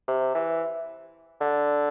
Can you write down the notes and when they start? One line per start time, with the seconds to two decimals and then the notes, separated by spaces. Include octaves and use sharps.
0.08 C3
0.35 E3
1.41 D3